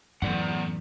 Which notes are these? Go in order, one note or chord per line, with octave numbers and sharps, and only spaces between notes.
F#2 A2 E3 B3 D5 F#5